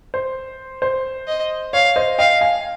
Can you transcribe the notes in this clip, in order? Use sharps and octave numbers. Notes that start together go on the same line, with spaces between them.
C5
C5
D#5
C#5 F5
C5 D#5
D#5 F5 G5
F5 G#5